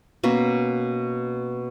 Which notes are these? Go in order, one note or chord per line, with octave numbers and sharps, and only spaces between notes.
B2 A#3 C#4